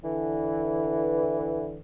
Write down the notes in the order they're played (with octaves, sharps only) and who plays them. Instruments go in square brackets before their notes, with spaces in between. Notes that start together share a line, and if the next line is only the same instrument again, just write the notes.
[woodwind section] D3 E3